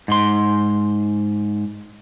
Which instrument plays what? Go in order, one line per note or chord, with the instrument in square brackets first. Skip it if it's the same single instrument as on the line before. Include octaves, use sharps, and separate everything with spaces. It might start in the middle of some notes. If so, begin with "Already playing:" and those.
[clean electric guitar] G#2 C6